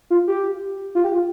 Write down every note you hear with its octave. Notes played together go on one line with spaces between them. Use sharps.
F4
G4
F4
G4
F4